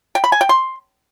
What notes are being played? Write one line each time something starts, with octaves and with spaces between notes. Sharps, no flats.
G5
B5
G#5
G5
C6